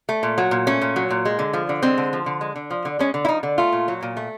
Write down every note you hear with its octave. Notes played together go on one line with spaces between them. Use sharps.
A3
A#2
F#3
A#2
A3 C#4
A#2
F#3
A#2
G#3
D3
F3
D3
G#3 C4
D3
F3
D3
G#3
D3
F3
D3
G#3 C#4
D3
E4
F3 D#4
D3
A3 F4
A#2
F#3
A#2
A3